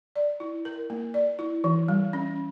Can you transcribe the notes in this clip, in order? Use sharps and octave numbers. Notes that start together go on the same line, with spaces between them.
D5
E4
A#4
A#3
D5
E4
E3
G3
C#4